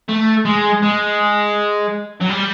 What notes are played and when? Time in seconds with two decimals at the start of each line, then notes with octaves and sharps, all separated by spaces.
0.09 A3
0.45 G#3
0.82 G#3
2.21 F#3
2.29 G3